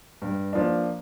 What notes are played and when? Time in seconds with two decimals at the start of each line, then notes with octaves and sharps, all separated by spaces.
0.22 G2
0.53 F3 A#3 D4